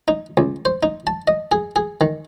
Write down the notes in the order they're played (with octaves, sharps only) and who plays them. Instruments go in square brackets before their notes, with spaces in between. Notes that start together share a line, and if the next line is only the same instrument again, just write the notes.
[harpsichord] D#4
C#2
C5
D#4
A5
D#5
G#4
G#4
D#3